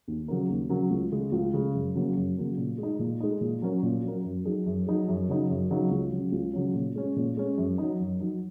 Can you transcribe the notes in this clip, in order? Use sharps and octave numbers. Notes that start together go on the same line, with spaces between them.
D#2
C#3 F#3 C#4 A#4
D#2
C#3 F#3 C#4 A#4
C#2
C#3 G#3
C#2
C#3 G#3
F#2
C#3 F#3 A#3 C#4
F#2
C#3 F#3 A#3 C#4
A#2
G#3
D#4
A#2
G#3 D#4
A#2
F#3 C#4 A#4
A#2
F#3 C#4 A#4
F#2
F#3 D#4 G#4
F#2
F#3 D#4 G#4
F#2
C#3 F#3 D#4
F#2
C#3 F#3 D#4
C#2
C#3 F#3 C#4
C#2
C#3 F#3 C#4
A#2
G#3 C#4
A#2
G#3 C#4
F#2
F#3 D#4
F#2
F#3 D#4